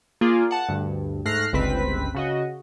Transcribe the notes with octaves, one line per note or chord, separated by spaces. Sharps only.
A#3 F4 G#4 D5
F#5 A5
D2 G2
G#2 A3 F6 F#6 A#6 C7
G1 C#2 C4 B4 B6
C#3 F#4 D#5